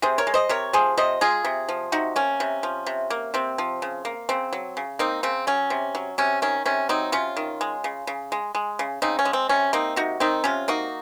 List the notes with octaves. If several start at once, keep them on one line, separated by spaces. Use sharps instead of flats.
C3 G#4 C5
A#4 C#5
G#3
C5 D#5
C3 A#4 C#5
F3 G#4 C5
C3 C5 D#5
G#3 F4 G#4
C3
F3
C3 D#4 F#4
A#3 C#4
C3
F3
C3
A#3
C3 C4
F3
C#3
A#3
C#3 C4
F#3
C#3
A#3 C4 D#4
C#3 C4
F#3 C#4
C3
F#3
C3 C#4
D#3 C#4
C3 C#4
F#3 C4 D#4
C3 C#4 F4
D#3
G#3
C#3
C#3
G#3
G#3
C#3
C#3 C4 D#4
C#4
G#3
C4
C3 C#4
A#3 C4 D#4
C3 D#4 F#4
D#3 C4 D#4
C3 C#4 F4
A#3 D#4 F#4